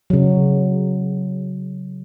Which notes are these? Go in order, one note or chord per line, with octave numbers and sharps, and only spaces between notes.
C#3 F#3